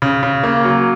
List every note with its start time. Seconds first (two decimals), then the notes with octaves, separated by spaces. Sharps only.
0.02 C#3
0.23 C#3
0.43 A#3
0.64 F#3